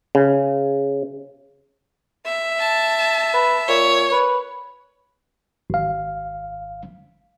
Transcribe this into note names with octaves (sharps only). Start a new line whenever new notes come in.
C#3
E5
A5
B4
A#2 C#5
B4
G#1 F5